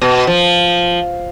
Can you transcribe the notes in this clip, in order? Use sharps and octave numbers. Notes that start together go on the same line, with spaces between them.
B2
F3